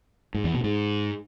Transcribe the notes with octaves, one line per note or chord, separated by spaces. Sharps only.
G#2
E2
B2
G#2